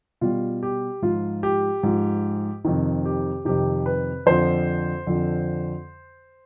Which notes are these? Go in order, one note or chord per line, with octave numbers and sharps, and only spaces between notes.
B2 G3 F4
G4
G#2 F3 F4
G4
G#2 F3
F2 C3 D#3
G4
F2 C3 D#3 G4
B4
F2 D3 F3 C5
F2 D3 F3